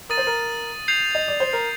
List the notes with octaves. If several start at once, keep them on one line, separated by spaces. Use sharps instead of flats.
A#4 D#6 A6 D#7
C5
A#4
G6 C7 F7
D#5
D5
C5
A#4